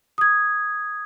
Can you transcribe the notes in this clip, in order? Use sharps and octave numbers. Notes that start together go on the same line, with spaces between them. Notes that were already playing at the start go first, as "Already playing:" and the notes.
D#6 G#6